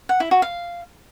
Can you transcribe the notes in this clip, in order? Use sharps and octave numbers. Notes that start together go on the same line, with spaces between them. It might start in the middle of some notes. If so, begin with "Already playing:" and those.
F#5
E4
F#4
F5